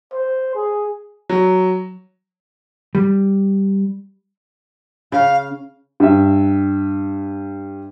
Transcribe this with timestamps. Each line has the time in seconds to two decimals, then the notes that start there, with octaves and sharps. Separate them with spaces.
0.13 C5
0.55 G#4
1.29 F#3
2.95 G3
5.12 C#3 F5
6.00 G2 E5